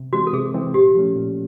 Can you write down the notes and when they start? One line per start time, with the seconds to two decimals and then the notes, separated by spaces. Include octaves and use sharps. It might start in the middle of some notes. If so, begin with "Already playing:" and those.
Already playing: C3
0.13 E3 G#3 C4 F#4
0.27 A4
0.33 C3 G#4
0.54 E3 G#3 C4
0.74 A#2 G4
0.95 F3 A3 C#4
1.15 A#2